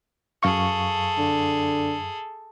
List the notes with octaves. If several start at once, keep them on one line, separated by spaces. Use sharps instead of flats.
F#2 G#4 A4 F5 C#6
D3